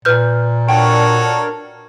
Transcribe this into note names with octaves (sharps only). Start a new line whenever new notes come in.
A#2 B4 F6 G6
D4 F#4 A4 A#4 C#5 G5